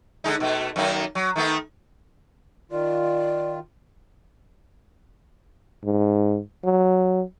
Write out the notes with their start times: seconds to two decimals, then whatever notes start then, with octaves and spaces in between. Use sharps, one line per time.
0.24 D3 G#3 D#4
0.40 B2 A3
0.76 F#2 D#3 A#3
1.15 F#3
1.36 D#3 A3 B3
2.72 D#3 F4 D5
5.84 G#2
6.64 F#3